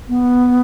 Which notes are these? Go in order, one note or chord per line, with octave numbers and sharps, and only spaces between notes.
B3